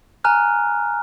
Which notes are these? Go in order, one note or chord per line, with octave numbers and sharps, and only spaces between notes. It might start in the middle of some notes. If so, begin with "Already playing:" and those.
G#5 A#5 F6 F#6